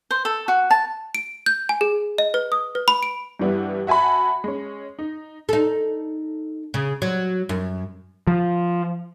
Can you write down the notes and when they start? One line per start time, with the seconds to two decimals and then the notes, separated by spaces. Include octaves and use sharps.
0.11 C5
0.25 A4
0.48 F#4
0.71 A5
1.15 D7
1.46 G6
1.69 G#5
1.81 G#4
2.18 D#5
2.34 B4
2.52 D#6
2.75 B4
2.88 B5
3.03 D7
3.39 G2 E3 G3 B3 E4
3.87 F#4 E5 G#5 A5 B5
4.44 G#3 C#4
4.99 D#4
5.49 D#4 A4
6.74 C#3
7.02 F#3
7.49 F#2
8.27 F3